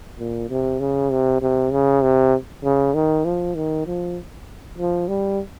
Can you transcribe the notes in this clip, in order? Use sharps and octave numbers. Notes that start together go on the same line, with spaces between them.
A#2
C3
C#3
C3
C3
C#3
C3
C#3
D#3
F3
D#3
F3
F3
G3